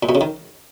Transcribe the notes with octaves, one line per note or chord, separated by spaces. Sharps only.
A#2
B2
C#3
D#3